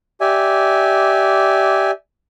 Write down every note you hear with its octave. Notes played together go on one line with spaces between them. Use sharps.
G4 D5 E5 G#5